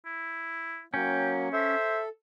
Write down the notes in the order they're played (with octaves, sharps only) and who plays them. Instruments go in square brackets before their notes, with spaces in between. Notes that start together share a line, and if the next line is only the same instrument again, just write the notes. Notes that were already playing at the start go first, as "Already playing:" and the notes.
[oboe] E4
[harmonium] F#3 A#3 [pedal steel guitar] C#4 [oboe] G5
[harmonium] A4 [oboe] C5 [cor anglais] E5